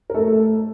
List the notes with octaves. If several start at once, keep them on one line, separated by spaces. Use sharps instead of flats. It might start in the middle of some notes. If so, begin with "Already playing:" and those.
A#4
A3 A4